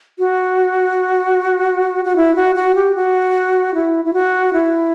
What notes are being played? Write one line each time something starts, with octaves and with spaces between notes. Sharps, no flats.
F#4
F#4
E4
F#4
F#4
G4
F#4
E4
E4
F#4
E4